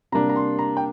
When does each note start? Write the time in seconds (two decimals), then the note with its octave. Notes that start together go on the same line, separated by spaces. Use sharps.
0.12 C3 G3 A#3 D4 A#5
0.29 A#5
0.36 C6
0.59 A#5
0.77 G5